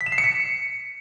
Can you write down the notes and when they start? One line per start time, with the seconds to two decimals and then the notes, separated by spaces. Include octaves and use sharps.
0.01 B6
0.06 E7
0.12 C7
0.18 C#7
0.24 B6